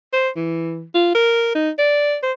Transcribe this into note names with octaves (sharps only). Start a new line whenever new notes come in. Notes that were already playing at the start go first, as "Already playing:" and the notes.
C5
E3
F4
A#4
D#4
D5
C5